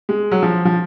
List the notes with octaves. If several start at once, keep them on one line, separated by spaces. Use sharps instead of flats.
G#3
F#3
F3
F3